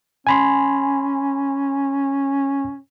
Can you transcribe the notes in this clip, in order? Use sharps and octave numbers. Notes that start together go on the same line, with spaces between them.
C#4 G#5 B5 C6